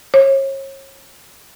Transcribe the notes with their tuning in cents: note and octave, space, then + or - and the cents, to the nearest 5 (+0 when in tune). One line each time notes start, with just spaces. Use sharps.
C#5 -35